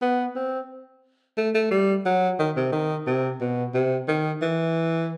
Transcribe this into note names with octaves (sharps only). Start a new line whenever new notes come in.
B3
C4
A3
A3
G3
F#3
D#3
C3
D#3
C3
B2
C3
D#3
E3